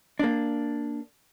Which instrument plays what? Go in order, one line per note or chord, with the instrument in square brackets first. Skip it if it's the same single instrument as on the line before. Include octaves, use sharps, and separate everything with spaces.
[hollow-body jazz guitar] A#3 D4